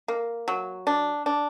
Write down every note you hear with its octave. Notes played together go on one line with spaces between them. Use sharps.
A#3
F#3
D4
D4